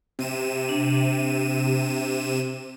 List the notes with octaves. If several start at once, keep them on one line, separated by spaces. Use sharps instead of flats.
C3 D#7 E7
D4